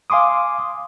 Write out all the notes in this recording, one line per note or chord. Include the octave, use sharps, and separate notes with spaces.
F5 G#5 C6 D6 D#6